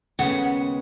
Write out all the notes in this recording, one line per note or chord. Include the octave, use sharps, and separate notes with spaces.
D#2 C#3 G#3 B3 F#5